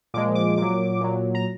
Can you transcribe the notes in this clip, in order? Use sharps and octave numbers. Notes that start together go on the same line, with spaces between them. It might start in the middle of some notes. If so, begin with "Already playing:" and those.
A#2 F3 G#3 D6
D6
A#2 F#3 D6
A#2 F#3
A#5